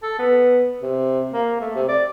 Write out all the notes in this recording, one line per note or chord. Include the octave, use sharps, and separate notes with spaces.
A4
B3
C3
A#3
A3
C3
D5